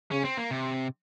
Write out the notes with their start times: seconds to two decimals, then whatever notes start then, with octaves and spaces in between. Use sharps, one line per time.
0.11 C#3 C#4
0.25 C4
0.37 A#3
0.51 C3